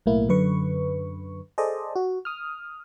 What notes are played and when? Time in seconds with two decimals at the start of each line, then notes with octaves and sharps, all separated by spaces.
0.06 B1 A2 A#3 E4
0.29 F#2 D3 B4 C#6
1.58 G#4 A4 C5 D5 D#5
1.96 F#4
2.25 D#6 F6